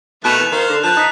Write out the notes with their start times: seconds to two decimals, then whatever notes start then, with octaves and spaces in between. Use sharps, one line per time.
0.24 B2 D#3 A3 B3 F#6 E7 F7
0.39 E3
0.52 D#3 C5 F5
0.69 D3
0.84 F3 B4 A5 F#6
0.97 D#4 F#6 B6